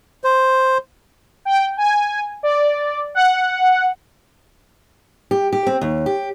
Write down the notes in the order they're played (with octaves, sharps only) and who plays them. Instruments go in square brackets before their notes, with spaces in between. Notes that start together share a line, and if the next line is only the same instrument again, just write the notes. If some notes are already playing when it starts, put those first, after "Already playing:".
[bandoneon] C5
[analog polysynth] G5
G#5
D5
F#5
[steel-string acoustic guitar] G4
G4
C4
D#2
G4